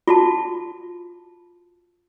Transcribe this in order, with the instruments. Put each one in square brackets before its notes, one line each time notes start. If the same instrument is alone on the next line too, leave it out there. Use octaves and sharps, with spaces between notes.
[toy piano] F4 F#4 A5